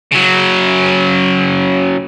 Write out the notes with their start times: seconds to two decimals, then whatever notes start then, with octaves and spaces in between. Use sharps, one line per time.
0.12 C#3 F#3